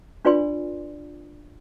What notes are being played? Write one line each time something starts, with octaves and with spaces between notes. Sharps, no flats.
D4 F4 B4 D5 G#5 C6